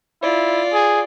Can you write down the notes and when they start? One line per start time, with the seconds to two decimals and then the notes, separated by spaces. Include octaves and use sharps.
0.22 E4 F4 D5
0.73 G#4